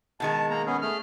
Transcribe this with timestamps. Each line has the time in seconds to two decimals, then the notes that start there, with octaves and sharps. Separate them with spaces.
0.20 B2 D#3 G#3 A5
0.50 A#3 A#5
0.66 B3 C#4 G#4
0.82 A3 G#4 F6